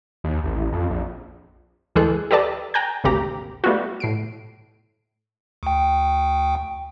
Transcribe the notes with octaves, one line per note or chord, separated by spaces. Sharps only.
D#2
A1
F2
A#1
D2 E3 G#3 G#4 A4 F#6
G4 A4 B4 D5 A5
G5 G#5 A#5 F#6 G6
G#1 D2 C3 A#3 G4 A#5
G3 A3 B3 D#4 F4 F#4
A2 C7 D7
D2 G5